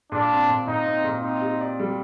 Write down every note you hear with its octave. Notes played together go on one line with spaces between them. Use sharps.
A#2 D4
C4
A#2
A#2 D#4
C4
A#2
C4 D#4
G4
D5
G3